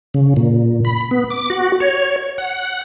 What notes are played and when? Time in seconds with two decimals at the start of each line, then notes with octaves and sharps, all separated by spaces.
0.14 C#3
0.37 A#2
0.85 B5
1.11 B3
1.30 D6
1.50 F#4
1.80 C#5
2.38 F#5